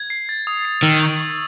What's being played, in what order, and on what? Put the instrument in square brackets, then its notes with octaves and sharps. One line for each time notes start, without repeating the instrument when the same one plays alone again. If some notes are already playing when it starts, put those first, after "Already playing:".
Already playing: [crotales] G#6
C7
A6
D#6
C7
[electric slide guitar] D#3 [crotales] E6
[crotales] C#6
C#6